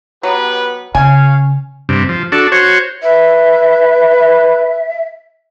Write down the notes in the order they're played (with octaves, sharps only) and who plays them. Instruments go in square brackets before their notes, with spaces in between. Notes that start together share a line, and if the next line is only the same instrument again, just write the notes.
[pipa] F#3 [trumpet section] B3 G4 B4
[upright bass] C#3 [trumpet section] C#5 F5 [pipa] G#5
[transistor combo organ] G2 C3
F3
D4 F#4 A4
F#4 C5 C#5
[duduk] B4 [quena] E5